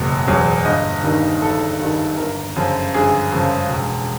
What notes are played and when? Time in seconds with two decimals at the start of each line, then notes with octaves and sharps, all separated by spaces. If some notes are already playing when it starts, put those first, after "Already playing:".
Already playing: F#1 E2 B2 F#3
0.27 E2 B2 F#3
0.65 G1 D#5
1.04 G2 D#3
1.42 G1 A4
1.80 G2 D#3
2.17 G1 A#4
2.56 F#2 C#3 F3
2.94 G1 G#4
3.32 F#2 C#3 F3
3.70 E1